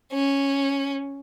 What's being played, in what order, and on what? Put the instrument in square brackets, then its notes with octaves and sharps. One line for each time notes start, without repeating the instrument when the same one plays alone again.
[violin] C#4